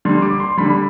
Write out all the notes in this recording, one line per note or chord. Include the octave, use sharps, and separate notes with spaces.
D3 G3 C6
D6
C6
D3 G3 B5